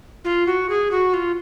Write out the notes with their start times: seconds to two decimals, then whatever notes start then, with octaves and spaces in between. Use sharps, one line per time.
0.24 F4
0.46 F#4
0.69 G#4
0.91 F#4
1.13 F4